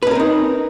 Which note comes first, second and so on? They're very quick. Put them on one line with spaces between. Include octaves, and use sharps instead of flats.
B4 C#4 A#4 C4 D#4